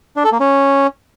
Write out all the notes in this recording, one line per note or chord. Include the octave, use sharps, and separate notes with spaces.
D4
A4
A#3
C#4